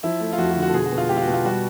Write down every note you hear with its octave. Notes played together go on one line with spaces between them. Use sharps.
F3 E4
A3
F4
F2 F#4
F#4
D3
F#4
A4
B2 G#4
F#4
B2
F4
G#3 G4
F4
F#4
B2
F4
G3 F#4